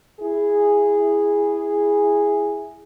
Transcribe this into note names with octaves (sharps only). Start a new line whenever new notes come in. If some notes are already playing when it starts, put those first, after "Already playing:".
E4 G#4